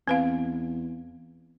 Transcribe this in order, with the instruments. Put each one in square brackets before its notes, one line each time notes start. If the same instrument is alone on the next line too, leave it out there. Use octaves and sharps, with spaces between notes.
[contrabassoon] E2 [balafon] C4 B4 F5